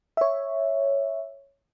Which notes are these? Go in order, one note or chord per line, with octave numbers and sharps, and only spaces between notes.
C#5 E5